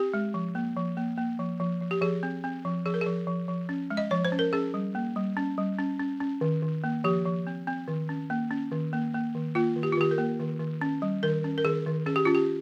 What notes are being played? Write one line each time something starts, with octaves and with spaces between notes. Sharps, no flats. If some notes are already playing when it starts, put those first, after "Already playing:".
Already playing: C4 G4
G#3
F3
A#3
F3
A#3
A#3
F3
F3
F3
G4
F3 G#4
C4
C4
F3
F3 G#4
A#4
G#4
F3
F3
F3
C#4
G#3
D#5
F3 C#5
C5
C#4
A#4
C#4 G#4
G3
A#3
G3
C#4
G3
C#4
C#4
C#4
D#3
D#3
A#3
F3 G4
F3
C4
C4
D#3
C#4
A#3
C#4
D#3
A#3
A#3
D#3
A#3 F4
D#3
G4
F4
D#3 G4
A#4
A#3
D#3
D#3
C#4
G3
D#3 A#4
C#4
A#4
D#3 G#4
D#3
C#4 G#4
G4
C#4 F4
G4